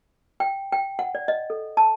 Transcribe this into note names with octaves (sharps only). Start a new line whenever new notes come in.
G5
G5
F#5
D5
D#5
A4
A5